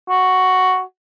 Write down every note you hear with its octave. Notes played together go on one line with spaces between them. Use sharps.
F#4